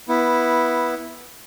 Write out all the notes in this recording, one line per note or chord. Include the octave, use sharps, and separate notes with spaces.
B3 E4